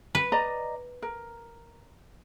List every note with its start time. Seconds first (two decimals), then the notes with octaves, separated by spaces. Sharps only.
0.15 B4
0.32 D5 D#5 A#5
1.02 A#4